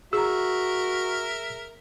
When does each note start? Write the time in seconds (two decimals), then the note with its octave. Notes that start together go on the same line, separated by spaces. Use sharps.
0.13 F#4 G#4 A#4 E5 A#5 E6